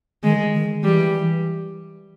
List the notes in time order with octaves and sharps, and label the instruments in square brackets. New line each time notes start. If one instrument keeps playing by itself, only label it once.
[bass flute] D#3 [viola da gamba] G#3
[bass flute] D#3
[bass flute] E3 [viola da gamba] G3